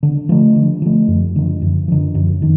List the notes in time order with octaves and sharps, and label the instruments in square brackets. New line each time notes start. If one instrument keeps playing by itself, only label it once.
[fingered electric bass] D3
F3 A3
D3
F3 A3
F#2
D3 F3
F#2
D3 F3
F#2
D#3